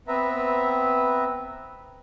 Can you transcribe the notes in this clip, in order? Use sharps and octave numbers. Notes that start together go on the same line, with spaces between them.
B3 C4 B4 E5 A#5